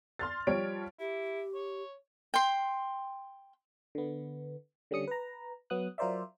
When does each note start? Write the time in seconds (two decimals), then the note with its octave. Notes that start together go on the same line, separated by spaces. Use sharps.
0.19 C6 F6 A6
0.47 F3 G3 C#5 D7
0.99 E4 G4
1.55 C#5
2.34 G5 C6
3.95 D3 B3
4.91 D3 G3 C#4 D#6 C#7
5.08 B4 A#5
5.70 F#3 B3 D#6 F#6
5.98 F#3 F4 A#4 C5 D5 E5